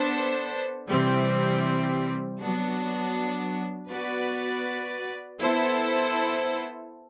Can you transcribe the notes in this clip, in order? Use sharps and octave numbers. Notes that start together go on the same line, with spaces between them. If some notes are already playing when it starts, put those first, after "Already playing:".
Already playing: B3 D4 A4 C5
C3 E3 G3 C4
F#3 B3 D4 F#4
B3 F#4 B4 D5
B3 E4 A4 C5